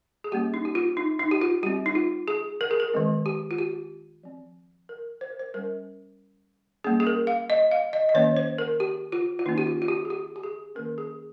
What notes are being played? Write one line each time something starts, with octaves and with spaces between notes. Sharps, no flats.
G#4
G3 A#3 C#4 G4
D#4
G4
F4
D#4
D#4
G4
F4
G3 C4 G4
D#4
F4
G#4
A#4
G#4
A#4
D#3 G#3 C4
G4
F4
G4
F3 C4
A#4
C5
A#4
C5
G3 C#4 A#4
G3 A#3 C#4 G#4
G#4
A#4
F5
D#5
F5
D#5
D#5
D#3 A#3 C#4 C#5
C5
A#4
G4
F4
F4
D#3 A#3 C#4 D#4
G4
F4
F4
G4
G#4
G4
G4
G#4
D#3 A#3 C#4 A#4
G#4